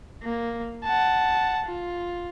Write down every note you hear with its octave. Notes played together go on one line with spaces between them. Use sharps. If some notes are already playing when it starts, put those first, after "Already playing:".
A#3
F#5 A5
F4